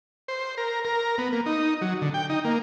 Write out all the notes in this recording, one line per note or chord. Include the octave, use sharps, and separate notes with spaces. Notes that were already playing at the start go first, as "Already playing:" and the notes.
C5
A#4
A#4
B3
A#3
D#4
F#3
D3
G5
D#4
A#3